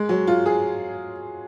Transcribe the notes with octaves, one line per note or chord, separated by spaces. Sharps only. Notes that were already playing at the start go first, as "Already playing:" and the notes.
Already playing: G#3
F#3
F4
G#4